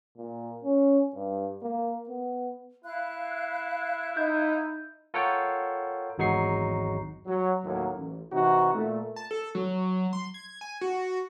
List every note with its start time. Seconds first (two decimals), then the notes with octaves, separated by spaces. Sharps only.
0.17 A#2
0.64 C#4
1.15 G2
1.62 A#3
2.09 B3
2.84 E4 F5 F#6
4.17 D#4 G6
5.14 F4 A4 A#4 C#5 F#5 G5
6.18 G#1 E2 F#3 D#4 C#6 C7
7.26 F#3
7.64 D#2 A2 F#3 A#3
7.96 A1
8.31 C3 E3 D#4 F#4
8.73 A#2 A3
9.16 A5
9.31 A4
9.55 F#3
10.13 C6
10.34 G#6
10.61 G#5
10.81 F#4